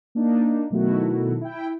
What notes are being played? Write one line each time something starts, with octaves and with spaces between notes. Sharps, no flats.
A#3 D4 D#4
B2 D#3 F#3 A3 E4 F#4
E4 G5